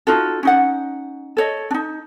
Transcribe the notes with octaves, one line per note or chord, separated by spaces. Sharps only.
D#4 F4 F#4 A4
C#4 D#4 F#5
A4 C#5 D#5
D4 D#4